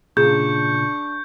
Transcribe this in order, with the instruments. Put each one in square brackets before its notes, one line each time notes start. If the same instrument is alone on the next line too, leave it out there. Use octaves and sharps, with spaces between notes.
[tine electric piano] A#2 C#3 F4 [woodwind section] D4 C#6 [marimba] G#4 [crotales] G6